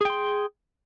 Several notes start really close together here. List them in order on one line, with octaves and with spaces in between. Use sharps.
G#4 G5 C6